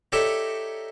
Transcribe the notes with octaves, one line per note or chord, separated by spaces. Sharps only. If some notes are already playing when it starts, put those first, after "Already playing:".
D#4 G4 A4 C#5 D5 E5